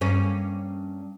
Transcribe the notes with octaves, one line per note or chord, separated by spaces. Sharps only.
G2 A#3 C#4